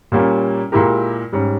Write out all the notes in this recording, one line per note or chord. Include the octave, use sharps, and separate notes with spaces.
A#2 G3 A#3 C#4
A#2 G#3 E4 G4 A#4
G#2 G3 C#4